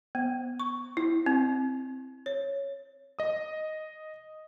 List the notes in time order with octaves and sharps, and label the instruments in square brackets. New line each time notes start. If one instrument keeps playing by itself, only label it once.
[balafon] B3
C#6
E4
C4
C#5
[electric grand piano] D#5 D#6